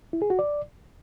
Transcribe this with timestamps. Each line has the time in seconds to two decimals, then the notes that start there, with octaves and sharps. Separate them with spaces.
0.13 E4
0.22 G#4
0.30 F#4
0.39 D5